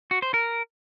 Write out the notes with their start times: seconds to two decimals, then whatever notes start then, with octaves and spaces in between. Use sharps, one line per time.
0.11 F#4
0.22 C5
0.34 A#4